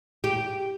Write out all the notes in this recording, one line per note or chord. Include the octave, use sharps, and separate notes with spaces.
G4